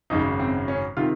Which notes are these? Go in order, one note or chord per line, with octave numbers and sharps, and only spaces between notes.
G#1 F#2 C#3 D#4
C4
C#4
C3 D#3 F4